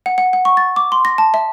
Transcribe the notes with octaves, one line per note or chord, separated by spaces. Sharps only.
F#5
F#5
F#5
C#6
A6
D6
C6
A#6
A5
E5